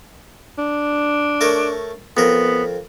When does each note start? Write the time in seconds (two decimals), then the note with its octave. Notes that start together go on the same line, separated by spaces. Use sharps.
0.58 D4
1.41 A3 A#4 C#5
2.17 F2 B3 A#4